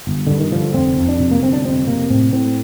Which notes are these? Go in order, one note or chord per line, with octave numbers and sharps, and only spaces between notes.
G1
G2 D3
D#3
D3 F3
F1 C4
F2
D4
C3
A#3
G1 C4
D4
F2 C4
C3 A#3
A2 C4
A2 C4